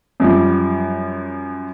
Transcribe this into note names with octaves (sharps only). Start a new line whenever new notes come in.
F#2 F3 G3